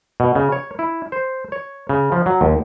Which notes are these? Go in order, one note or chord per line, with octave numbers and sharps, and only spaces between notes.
B2
C#3
C#5
E4
C5
C#5
C#3
F3
F#3
D#2